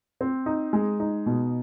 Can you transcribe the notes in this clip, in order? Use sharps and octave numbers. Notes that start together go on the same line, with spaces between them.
C4
D#4
G#3
D#4
B2